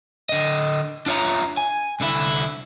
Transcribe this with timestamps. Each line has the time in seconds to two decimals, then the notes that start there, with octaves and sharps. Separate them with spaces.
0.29 D3 D#5
1.06 D4 F4 C#5 E5 A#5
1.57 G#5
2.00 C2 D3 E4 E5